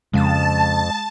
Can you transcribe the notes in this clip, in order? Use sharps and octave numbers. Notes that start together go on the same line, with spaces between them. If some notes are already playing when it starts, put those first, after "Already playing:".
F2 C#3 G#3 F5 A5 D#6